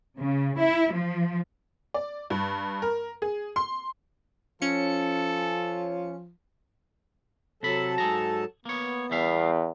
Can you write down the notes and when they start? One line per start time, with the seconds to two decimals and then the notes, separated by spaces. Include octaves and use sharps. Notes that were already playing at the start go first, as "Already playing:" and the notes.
0.19 C#3
0.59 E4
0.93 F3
1.94 D5
2.30 G2
2.82 A#4
3.22 G#4
3.56 C6
4.62 F3 C#4 A4 C#7
7.63 C3 F#3 A4 A5 B5
7.98 G#2 G#4 A#5
8.65 A#3 B3 C#5
9.11 E2 G3 E5 F5